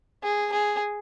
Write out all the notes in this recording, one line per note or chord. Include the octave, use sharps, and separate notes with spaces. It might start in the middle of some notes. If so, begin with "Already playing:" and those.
G#4
G#4